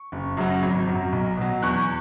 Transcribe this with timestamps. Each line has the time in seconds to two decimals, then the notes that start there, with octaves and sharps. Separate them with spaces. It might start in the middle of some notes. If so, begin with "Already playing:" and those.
Already playing: C#6
0.12 F#1
0.37 F#2 C#3 F#3
0.62 G#1
0.88 F#2 F#3
1.12 B1
1.37 B2 F#3
1.63 E2 C#6 F#6